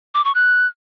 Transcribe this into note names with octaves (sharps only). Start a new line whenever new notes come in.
D6
C#6
F#6